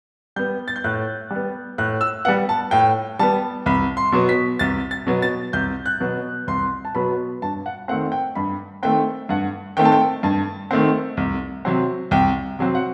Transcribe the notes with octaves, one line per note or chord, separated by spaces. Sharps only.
G3 B3 G6
A6
G6
A2 F#6
G3
B3
A2 F#6
E6
G3 B3 F#5
A5
A2 G5
G3 B3 A5
C2 B5
C6
B2 F#3 B3
B6
C2 A6
A6
B2 F#3 B3
A6
C2 G6
F#6
B2 F#3 B3
C2 C6
A5
B2 F#3 B3 B5
G2 A5
F#5
D#3 A3 C4 F#5
G5
G2 B5
D#3 A3 C4 G5
G2 F#5
D#3 A3 C4 G5
A5
G5
G2 A5
D#3 A3 C4
C2
C3 F#3 C4
C2 G5
C3 F#3 C4
F#5